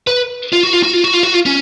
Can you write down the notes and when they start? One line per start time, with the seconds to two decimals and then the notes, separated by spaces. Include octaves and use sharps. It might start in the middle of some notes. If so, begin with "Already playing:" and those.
0.07 B4
0.53 F4
0.63 F#4
0.73 F4
0.83 F#4
0.93 F4
1.04 F#4
1.14 F4
1.23 F#4
1.34 F4
1.46 C#4